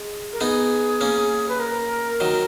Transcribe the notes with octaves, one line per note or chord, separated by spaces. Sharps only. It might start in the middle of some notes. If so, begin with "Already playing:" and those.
Already playing: G#3
A#4
B3 D#4 G#4
A#3 C#4
B4
A#4
D#3 F#3